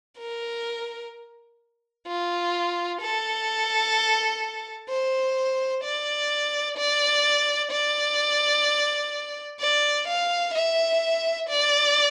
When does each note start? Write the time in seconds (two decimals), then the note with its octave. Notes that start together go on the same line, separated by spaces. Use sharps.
0.19 A#4
2.07 F4
3.01 A4
4.89 C5
5.84 D5
6.77 D5
7.71 D5
9.60 D5
10.08 F5
10.54 E5
11.49 D5